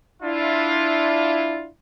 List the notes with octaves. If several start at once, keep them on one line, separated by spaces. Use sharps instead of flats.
D4 E4 F4